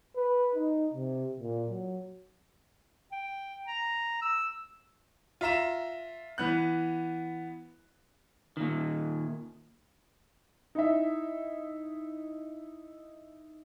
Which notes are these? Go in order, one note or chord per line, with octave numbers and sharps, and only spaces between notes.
B4
D#4
C3
A#2
F#3
G5
A#5
E6
F4 E5 A#5 E7
E3 B3 F#6
A#2 D#3
D#4 E4 E5